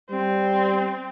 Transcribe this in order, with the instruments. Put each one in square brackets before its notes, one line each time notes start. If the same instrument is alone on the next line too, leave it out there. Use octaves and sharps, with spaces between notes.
[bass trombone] G3 [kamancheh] C4